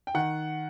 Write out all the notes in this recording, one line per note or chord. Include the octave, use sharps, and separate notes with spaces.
G5
D#3 F#5